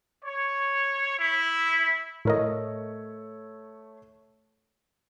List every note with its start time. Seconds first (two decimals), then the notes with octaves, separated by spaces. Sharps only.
0.24 C#5
1.20 E4
2.25 A2 A3 A#4 C#5 D#5